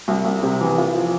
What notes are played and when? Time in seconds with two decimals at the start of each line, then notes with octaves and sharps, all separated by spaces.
0.08 C2
0.24 C2
0.43 C3
0.61 E3
0.78 F4
0.96 F3